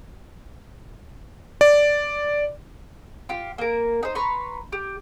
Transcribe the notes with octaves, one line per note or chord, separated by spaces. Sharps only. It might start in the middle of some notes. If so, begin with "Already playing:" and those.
D5
F4 G4
A#3 A#4
D#4 C5
B4 A#5 C6 C#6
G4